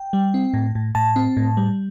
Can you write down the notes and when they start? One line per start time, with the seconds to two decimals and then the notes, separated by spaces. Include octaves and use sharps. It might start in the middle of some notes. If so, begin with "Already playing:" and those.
Already playing: G5
0.13 G3
0.34 C4
0.54 A2
0.75 A2
0.95 A2 A5
1.16 C4
1.37 A2
1.57 G3